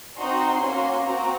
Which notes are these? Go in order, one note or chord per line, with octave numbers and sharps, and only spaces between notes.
C4 D#4 F#4 C6
A#3 C#4 F#4
C4 F#4 A#5